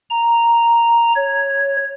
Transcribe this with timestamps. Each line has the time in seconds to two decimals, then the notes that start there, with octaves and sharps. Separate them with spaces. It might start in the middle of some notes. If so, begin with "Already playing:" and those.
0.10 A#5
1.16 C#5